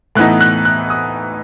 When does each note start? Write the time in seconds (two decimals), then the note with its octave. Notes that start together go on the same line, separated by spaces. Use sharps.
0.15 A2 E3 B3 D#4 F#6
0.41 F#6
0.65 F#6
0.90 D#6